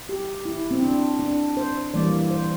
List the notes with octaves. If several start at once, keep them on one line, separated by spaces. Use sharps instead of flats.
G4
E4
C4
D4
D4
C5
E3 G3 A#3 D5
C5